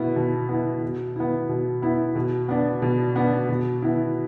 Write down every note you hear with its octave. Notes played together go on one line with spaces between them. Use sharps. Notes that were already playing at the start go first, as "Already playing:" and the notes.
Already playing: B2 B3 E4
B2
B3 E4
B2
B3 E4
B2
B3 E4
B2
B3 D4
B2
B3 D4
B2
B3 E4